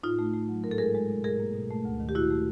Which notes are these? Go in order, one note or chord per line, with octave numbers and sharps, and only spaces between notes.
A2 D#4 F4
A3
A3
F#3
G#2 A#4
A4
G#3 G#4 A#4
G#3
B2
G#2 G#4 A#4
A#3
B2
A3
D2
D#3
G4
A#2 E4 F#4
A3